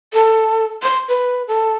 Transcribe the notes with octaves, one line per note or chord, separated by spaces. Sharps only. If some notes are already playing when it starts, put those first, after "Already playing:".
A4
C6
B4
A4